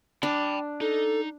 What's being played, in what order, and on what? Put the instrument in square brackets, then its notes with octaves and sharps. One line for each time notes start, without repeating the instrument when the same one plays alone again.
[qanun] D4 [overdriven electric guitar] G5 B5
[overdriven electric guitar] D#4 [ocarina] A4